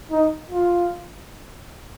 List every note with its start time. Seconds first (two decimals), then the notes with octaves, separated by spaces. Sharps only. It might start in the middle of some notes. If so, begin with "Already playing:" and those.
0.12 D#4
0.51 F4